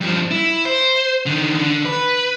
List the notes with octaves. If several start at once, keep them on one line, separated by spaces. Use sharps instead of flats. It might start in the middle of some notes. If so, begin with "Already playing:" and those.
G2 F3
E4
C5
D3 D#3
D3
B4